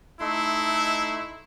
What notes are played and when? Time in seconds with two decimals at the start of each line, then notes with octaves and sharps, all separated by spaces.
0.20 A3 D#4 E4 C6